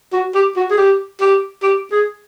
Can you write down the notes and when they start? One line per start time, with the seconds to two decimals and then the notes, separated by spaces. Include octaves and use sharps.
0.13 F#4
0.35 G4
0.56 F#4
0.70 G#4
0.77 G4
1.21 G4
1.63 G4
1.92 G#4